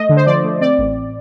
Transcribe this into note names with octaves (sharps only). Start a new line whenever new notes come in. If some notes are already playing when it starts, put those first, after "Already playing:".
Already playing: A3 D#5
D3
C5
F3 D5
A3
C4 D5
A1